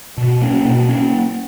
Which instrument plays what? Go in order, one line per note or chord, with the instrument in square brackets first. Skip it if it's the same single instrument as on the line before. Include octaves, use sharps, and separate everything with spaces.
[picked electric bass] B2
A#3 C#4
B2
A#3 C#4